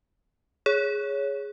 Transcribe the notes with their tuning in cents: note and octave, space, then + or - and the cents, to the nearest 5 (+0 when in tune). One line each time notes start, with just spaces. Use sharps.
G#4 +0 C#5 +0